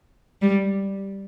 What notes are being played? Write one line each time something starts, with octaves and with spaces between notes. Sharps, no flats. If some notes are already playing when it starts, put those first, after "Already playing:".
G3